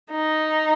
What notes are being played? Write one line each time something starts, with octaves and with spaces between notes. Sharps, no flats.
D#4